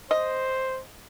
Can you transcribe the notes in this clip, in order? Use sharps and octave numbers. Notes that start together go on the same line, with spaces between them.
C5 D#5